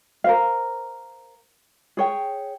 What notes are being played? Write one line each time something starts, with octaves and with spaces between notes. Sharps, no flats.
A#4 C5 F5
G#4 C#5 G5